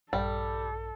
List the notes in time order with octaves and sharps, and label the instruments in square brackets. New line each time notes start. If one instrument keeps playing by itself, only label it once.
[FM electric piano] A#1 G2 [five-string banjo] G3 [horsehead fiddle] A4